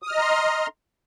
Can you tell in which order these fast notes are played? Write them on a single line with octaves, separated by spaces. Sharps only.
D#6 F6 D#5 A#5 C6